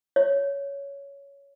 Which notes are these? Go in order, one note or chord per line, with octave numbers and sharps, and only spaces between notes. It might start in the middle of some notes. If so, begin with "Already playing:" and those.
C#5